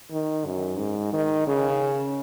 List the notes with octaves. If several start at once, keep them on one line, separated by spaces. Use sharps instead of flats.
D#3
F#2
G#2
D#3
C#3